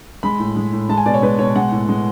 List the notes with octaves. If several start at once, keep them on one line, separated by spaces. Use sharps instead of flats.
G#3 B5
A2
G#3
A2
G#3 A5
G#5
B2 D5
C#5
G#3 B4
B2 C#5
G#3 F#5
A2
G#3